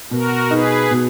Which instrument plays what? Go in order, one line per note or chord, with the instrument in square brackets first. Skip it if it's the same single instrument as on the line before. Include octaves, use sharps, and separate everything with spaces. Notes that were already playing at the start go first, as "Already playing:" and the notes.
[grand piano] B2 [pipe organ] F#4 A#4
[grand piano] D#4 [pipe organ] G#4 B4
[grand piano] B2